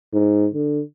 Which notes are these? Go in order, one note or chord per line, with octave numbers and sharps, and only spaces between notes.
G#2
D3